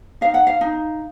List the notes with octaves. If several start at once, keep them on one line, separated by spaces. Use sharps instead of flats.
D#4 F5
F#5
F5
D#4